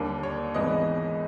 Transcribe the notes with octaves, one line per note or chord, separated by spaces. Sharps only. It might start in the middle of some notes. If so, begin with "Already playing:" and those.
Already playing: D#2 D3 G3 A#3
C#5
G#1 G#2 E3 G#3 B3 D#5